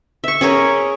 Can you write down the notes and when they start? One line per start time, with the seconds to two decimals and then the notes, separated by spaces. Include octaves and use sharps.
0.24 E5 C#6
0.41 C#4 G#4 A#4 C#5